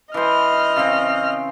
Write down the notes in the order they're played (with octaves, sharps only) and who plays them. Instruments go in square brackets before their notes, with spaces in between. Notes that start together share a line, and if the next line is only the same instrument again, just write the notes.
[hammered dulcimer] E3 C5 [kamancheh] D#5 F6
[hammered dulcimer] C#3 C4